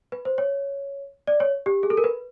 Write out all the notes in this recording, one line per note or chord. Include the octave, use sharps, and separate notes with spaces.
B4
C5
C#5
D5
C#5
G4
G#4
A4
A#4
B4